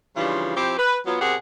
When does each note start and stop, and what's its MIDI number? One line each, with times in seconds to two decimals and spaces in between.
0.16 0.54 49
0.16 0.54 52
0.16 0.54 53
0.16 0.54 55
0.16 0.54 62
0.16 0.54 65
0.56 0.75 53
0.56 0.75 60
0.56 0.75 64
0.56 0.75 67
0.56 0.75 72
0.78 0.96 71
1.06 1.16 54
1.06 1.16 59
1.06 1.16 65
1.20 1.34 47
1.20 1.34 60
1.20 1.34 67
1.20 1.34 68
1.20 1.34 70
1.20 1.34 78